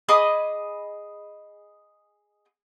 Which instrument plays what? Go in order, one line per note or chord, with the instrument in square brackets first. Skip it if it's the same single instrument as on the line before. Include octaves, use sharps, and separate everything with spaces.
[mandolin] G#4 D#5 B5 D6